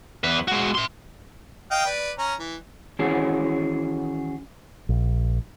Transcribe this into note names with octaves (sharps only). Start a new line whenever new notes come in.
E2 B4
G#3 F#4
E5 C6
D#5 F5 G5
B4 D5
C#4 A#5
E3
D#3 E3 C#4 F#4 G#4
A#1